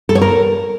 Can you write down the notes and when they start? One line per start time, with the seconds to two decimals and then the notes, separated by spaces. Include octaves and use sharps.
0.09 A4
0.15 C#5
0.22 A#4